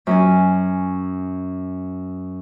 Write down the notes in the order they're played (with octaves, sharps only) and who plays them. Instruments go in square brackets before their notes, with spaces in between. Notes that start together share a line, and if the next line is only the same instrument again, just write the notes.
[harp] F#2 C#4 G#5